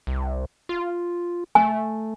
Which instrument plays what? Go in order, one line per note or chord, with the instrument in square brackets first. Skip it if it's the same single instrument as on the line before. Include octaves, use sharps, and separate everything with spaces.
[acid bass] C2
F4
[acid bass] A3 [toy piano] G#5